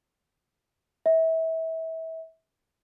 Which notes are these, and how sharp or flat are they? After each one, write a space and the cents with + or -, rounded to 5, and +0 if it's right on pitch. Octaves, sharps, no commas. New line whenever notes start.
E5 -30